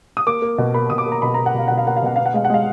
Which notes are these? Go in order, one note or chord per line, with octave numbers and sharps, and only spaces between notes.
D#6
A#3 D6
A#3
B2
A#3 B5
B2 D#6
D6
A#3
A#5
B2 B5
A#5
A#3
F#5
B2 F5
B2 F#5
F5
A#3 F#5
F5
B2 F#5
B3 F5
F#5
G#3 F5
F#5
G#3 F5